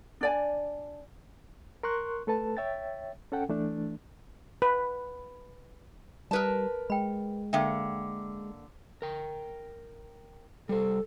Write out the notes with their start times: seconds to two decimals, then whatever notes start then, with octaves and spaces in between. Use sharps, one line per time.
0.21 D4 D5 G#5
1.83 A#4 C6 C#6 F#6
2.27 A3 A4 B4 A5
2.57 C#5 E5 G5 A6
3.32 C#4 A4 F#5 G5
3.49 E3 A3 D4
4.62 B4
6.31 G3 A#4 B4 A5
6.90 G#3 G5 B5
7.53 D3 A#3 E5 G5
9.02 A#4 G5
10.69 G3 A4 C5